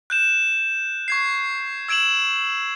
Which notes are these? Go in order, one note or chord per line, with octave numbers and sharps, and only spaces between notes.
F#6 G6 E7
C#6 G#6 C7
E6 G#6 D7 E7 F#7